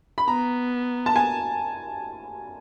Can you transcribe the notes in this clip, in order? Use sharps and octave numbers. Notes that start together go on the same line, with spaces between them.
B5
B3 A#5
A5
G#5